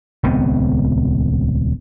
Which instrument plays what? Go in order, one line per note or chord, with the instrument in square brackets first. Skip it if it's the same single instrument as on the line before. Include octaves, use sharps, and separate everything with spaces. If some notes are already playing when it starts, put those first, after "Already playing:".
[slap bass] D#1 C#2 B3 C4